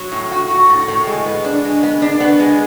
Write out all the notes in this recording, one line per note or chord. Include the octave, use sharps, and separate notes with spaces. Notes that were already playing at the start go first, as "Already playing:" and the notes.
Already playing: F#3
A2
F#4
F#4
A2
A2
G#3
B3
D4
G#3
B3
D4
B3
G#3